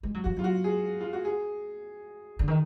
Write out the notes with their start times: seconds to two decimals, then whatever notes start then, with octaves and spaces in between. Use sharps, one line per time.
0.03 G#3
0.14 F#3
0.24 F3 F#4
0.37 F#3 F4
0.44 F#4
0.64 G#4
1.01 F4
1.13 F#4
1.25 G#4
2.39 D3
2.48 D#3